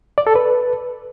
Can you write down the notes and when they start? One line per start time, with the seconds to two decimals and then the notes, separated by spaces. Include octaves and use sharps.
0.18 D5
0.27 A4
0.35 B4